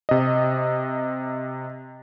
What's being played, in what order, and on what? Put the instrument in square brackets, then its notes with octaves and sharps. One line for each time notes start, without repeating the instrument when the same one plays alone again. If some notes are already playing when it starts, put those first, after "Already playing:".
[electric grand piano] C3 D#5